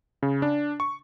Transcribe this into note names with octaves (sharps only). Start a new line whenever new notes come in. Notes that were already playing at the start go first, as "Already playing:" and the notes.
C#3
D4
C#6